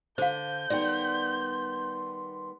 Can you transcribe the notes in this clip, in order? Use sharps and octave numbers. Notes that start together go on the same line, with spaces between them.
D3 C5 F5 G6
D#3 G3 B3 D5 G5 C6